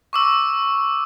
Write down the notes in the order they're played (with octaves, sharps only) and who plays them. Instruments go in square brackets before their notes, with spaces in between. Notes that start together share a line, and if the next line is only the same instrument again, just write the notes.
[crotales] C#6 D6 E6